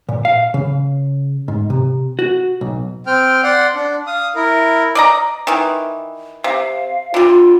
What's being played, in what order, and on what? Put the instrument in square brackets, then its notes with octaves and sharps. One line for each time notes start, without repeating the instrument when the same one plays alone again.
[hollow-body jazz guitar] A#2
F5
C#3
G#2
C3
F#4
B1
[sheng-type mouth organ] C4 G5 F6
D5 F#5 C6
D4
F5 D#6
E4 A#4
[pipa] D5 D#5 A#5
D#3 E3
[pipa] C3 [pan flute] F5
[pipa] D3 G3 [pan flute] F4